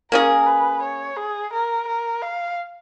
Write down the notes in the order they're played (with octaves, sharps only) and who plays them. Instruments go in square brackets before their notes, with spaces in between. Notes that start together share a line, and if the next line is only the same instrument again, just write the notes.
[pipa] A#3 C#4 G#4 [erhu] A#4
[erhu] B4
C#5
G#4
A#4
A#4
F5